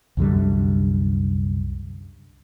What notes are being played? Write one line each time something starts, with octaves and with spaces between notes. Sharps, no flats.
C2 F#2 D3 G3